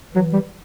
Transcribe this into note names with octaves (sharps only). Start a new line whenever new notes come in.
E3 F#3
G3